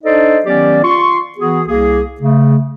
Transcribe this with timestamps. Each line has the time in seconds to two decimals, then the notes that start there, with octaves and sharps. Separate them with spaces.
0.04 D4 D#4 A4 C5 D5 D#5
0.46 D#3 F#3 B3 C#4 G4 D5
0.83 F4 C6 C#6
1.38 E3 B3 F#4 G#4
1.68 C2 A#3 G#4
2.21 C#3 A3